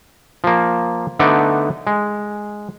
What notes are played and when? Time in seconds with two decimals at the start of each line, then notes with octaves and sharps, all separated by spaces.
0.44 F3 A#3
1.19 D3 A3 B3 D#4 D5
1.87 G#3